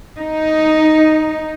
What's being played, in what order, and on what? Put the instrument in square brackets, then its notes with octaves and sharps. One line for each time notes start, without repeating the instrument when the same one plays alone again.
[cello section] D#4